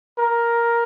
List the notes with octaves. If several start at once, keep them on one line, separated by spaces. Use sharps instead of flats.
A#4